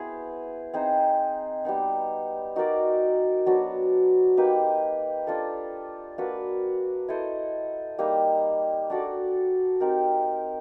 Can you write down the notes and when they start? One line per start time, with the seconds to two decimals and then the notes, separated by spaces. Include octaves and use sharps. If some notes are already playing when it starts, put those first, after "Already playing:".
Already playing: B3 E4 G#4 C5
0.74 C4 D#4 G#4 C5
1.65 G3 B3 D#4
2.56 D#4 F#4 A#4 D5
3.46 F#3 B3 D4 F#4
4.37 A#3 D#4 G4 B4
5.27 D4 F4 A4
6.18 A#3 D4 F#4 B4
7.08 E4 A4 C5 D#5
7.98 G3 A#3 D#4
8.90 D4 F#4 A4 D5
9.80 C4 D#4 G4 A#4